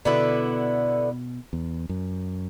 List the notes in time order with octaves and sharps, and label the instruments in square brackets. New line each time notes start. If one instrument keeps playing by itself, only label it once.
[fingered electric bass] B2 [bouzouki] D3 B3 E4
[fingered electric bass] E2
F#2